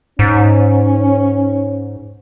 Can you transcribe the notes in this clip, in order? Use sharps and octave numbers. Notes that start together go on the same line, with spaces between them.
G#2 C#4